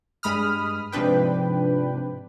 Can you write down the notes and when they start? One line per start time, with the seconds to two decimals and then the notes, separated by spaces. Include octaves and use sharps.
0.23 G2 G#3 B5 D#6 F6
0.92 G#2 C3 F3 D4 B4 G5